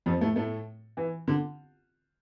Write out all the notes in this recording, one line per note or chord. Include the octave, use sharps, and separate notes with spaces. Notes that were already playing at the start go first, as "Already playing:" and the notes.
F2 F3
A2 A3
A2 A3
E3
D3